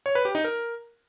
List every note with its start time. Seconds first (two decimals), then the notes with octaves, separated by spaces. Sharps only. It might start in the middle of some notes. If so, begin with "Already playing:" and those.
0.06 C#5
0.15 B4
0.25 G4
0.35 D#4
0.44 A#4